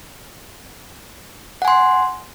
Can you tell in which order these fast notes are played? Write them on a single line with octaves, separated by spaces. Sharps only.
F#5 G#5 C6